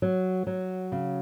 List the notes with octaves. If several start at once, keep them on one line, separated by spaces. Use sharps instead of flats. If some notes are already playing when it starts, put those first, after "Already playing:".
F#3
F#3
C#3